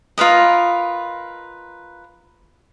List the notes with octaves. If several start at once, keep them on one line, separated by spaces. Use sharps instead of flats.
F4 A#4 B4 D#5